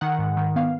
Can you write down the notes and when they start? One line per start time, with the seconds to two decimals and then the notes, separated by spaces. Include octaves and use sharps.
0.01 D#3 F#5
0.19 G#2
0.37 D#3
0.56 B3 F5